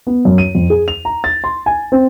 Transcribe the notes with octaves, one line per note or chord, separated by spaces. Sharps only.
B3
F#2
D#7
F2
G#4
F7
A#5
A6
C6
G#5
C4